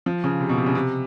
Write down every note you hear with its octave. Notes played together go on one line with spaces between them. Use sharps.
F3
C#3
C3
B2
C3
C#3
C3